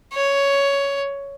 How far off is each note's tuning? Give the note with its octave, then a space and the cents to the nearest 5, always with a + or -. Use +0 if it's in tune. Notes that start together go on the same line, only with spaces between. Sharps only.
C#5 +10